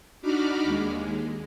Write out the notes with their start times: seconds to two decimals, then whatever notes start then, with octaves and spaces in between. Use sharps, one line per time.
0.22 D4 D#4 F#4 B5 D6 F6
0.64 D#2 G#3